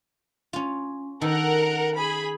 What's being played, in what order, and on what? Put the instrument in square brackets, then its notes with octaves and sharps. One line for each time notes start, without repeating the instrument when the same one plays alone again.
[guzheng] C#4 F4
[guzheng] D#3 A4 [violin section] A#4 F#5
[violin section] G#4 B5